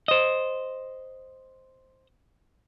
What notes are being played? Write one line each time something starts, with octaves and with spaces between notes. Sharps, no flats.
C5 D#5